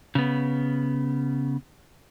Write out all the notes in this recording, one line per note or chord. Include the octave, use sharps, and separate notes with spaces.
C#3 B3